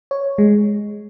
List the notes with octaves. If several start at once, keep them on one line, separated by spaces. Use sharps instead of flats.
C#5
G#3